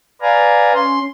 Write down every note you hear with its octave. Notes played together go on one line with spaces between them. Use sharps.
B4 D5 F5 G#5 A#5
C#4 C6